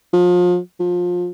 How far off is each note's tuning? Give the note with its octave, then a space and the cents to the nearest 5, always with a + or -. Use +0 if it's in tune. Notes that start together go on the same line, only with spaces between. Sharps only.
F3 +35
F3 +25